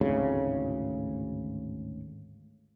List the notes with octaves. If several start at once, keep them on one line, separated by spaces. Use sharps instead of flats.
G#1 D2 A2 C#3